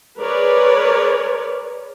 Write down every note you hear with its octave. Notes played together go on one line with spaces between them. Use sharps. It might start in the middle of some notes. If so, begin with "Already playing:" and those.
G#4 A#4 B4 C#5 D5